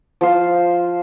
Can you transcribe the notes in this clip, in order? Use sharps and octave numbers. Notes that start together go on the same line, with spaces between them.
F3 C5 F5